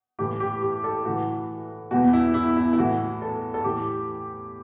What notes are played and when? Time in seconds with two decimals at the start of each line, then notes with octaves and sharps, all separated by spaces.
0.19 A2 E3 G4
0.40 G4
0.62 G4
0.84 A4
1.05 A2 E3 F#4
1.91 E2 B2 F#4
2.13 E4
2.34 E4
2.56 E4
2.73 E4
2.78 A2 E3 F#4
3.22 A4
3.54 A4
3.64 A2 E3 G4